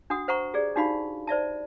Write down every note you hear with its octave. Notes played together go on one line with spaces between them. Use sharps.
D4 F#4 F#5 D#6
C5 F#5 A#5 C#6
G4 G#4 D5
D4 D#4 F#4 G4 F5 B5
C5 D5 E5 A5